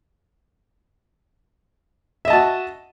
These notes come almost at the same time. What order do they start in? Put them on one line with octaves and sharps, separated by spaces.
E5 D#5 A5 F#4